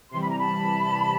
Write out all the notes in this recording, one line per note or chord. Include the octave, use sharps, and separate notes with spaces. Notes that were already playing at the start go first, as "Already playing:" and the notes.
C3 E3 G3 C6
B5
A#5
A5 B5